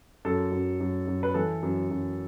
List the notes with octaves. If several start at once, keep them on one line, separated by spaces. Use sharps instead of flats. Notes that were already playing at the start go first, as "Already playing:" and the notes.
F#2 A4
F#2
F#2
F#2
B4
E3 A4
F#2
F#2